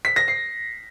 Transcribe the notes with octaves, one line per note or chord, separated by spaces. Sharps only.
B6
A#6
C7